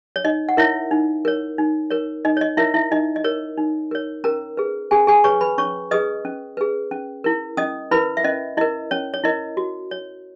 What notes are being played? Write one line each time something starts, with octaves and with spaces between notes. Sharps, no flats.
C#5
D#4 D#5
F#5
E4 A#4 C#5 E5
D#4
A#4 C#5
D#4
A#4 C#5
D#4 D#5
C#5
D#5
E4 A#4 C#5 E5
E4 E5
D#4 D#5
D#5
A#4 C#5
D#4
A#4 C#5
C#4 A#4 A#5
G#4 B4
C#4 G#4 G#5
G#4 G#5
G#4 B4 C#5 C#6
B4 B5
C#4 C#5 C#6
G#4 B4 D#5 D#6
C#4
G#4 B4
C#4
E4 A#4
C#4 D#5 D#6
E4 A#4 B4 B5
E5
C#4 D#5
E4 A#4 D#5
C#4 C#5
C#5
E4 A#4 D#5
F#4
C#5